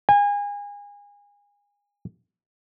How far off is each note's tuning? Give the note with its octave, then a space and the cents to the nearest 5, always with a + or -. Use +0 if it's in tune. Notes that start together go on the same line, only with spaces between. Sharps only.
G#5 -30